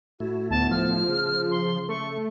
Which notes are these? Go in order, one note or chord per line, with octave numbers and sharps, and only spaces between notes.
A2 A3 E4 F#4
D2 B3 A5
F3 F6
C#3 G#4
C6
A3 C#6